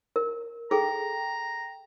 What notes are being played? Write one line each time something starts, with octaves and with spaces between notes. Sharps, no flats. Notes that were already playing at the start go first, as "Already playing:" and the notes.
A#4
G#4 A4 G5 A#5